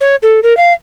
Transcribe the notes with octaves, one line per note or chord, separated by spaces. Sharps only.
C#5
A4
A#4
F5